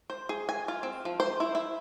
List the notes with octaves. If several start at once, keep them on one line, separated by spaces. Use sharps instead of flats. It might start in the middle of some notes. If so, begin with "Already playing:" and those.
C5
G#4
G#5
F4
C4
F3
C5
E4
E4